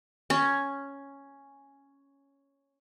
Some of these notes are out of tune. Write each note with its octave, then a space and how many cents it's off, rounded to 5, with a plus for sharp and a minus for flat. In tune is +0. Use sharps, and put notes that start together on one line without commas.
C#4 +0